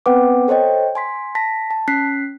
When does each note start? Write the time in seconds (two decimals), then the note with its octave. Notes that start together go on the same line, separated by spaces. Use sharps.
0.06 B3 C4 B4 F#5 G5 D6
0.48 A4 C5 C#5 D#5 G5
0.95 G#5 C6 B6
1.35 A5 A#6 B6
1.70 A5
1.88 C#4 F#6 B6 C7